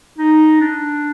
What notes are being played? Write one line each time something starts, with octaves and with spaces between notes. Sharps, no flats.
D#4
D4